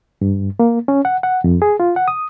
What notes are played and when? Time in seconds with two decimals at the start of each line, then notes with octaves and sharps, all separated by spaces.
0.21 G2
0.59 A#3
0.88 C#4
1.05 F#5
1.23 F#5
1.44 F2
1.62 G#4
1.80 F4
1.96 F#5
2.08 D#6